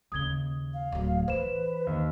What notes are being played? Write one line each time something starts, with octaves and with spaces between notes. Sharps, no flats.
D#2 C#3 D#6 G#6 G7
F5
D1 F#3
E3 B4 C5 E7
D#2